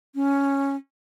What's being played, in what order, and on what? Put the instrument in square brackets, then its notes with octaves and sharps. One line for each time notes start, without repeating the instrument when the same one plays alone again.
[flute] C#4